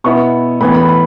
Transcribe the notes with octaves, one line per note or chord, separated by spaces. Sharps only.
B2 B3 E4 C#6
A2 E3 B3 B5
B5
B5